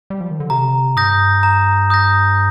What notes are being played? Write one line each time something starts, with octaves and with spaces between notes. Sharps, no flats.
G3
F3
D#3
D3
C3 A#5
G2 D#6 G6 A#6
A#5
D#6 G6 A#6